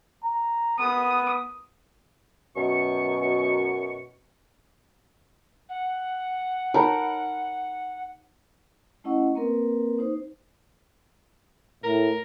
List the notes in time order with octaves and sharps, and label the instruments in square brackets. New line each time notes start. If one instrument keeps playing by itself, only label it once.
[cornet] A#5
[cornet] B3 [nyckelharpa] D#6
[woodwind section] F#2 B2 C#6
[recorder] F#5
[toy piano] D#4 C#5 B5 [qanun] A#4
[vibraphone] A3 C#4 E4 D#5 F#5 C#6
A#3 C4 A#4 B4
D#4 C5
[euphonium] A2 [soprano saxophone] A#4